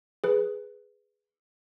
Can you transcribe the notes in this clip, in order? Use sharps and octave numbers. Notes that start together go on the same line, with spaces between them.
G#4 B4